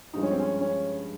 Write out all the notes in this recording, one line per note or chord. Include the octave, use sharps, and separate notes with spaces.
G2 F3 G#3 D#4
C#4
C4
C#4
C#4